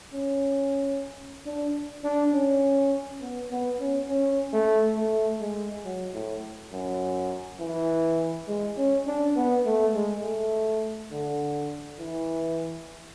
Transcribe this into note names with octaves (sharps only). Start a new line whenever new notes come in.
C#4
D4
D4
C#4
B3
B3
C#4
C#4
A3
A3
G#3
F#3
A2
F#2
E3
G#3
C#4
D4
B3
A3
G#3
A3
D3
E3